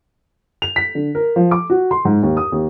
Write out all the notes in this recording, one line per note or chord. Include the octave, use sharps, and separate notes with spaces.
F7
B6
D3
A#4
F3
D6
F#4
C6
G#2
D#2
D#6
D#2